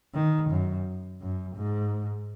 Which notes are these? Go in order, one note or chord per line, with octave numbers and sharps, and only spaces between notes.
D#3
F#2
F#2
G#2